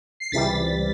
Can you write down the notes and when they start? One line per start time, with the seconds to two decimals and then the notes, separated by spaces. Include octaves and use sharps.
0.20 C7
0.32 C#2 C3 E3 G3 A6 B6